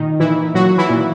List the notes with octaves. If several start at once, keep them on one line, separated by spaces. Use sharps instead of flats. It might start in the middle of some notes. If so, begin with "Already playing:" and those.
Already playing: A#2 D#3 D#4
A#2 E3 E4
A#2 F#3 F#4
E3 E4
A#2